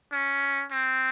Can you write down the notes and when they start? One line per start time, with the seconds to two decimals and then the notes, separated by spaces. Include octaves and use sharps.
0.12 C#4
0.71 C4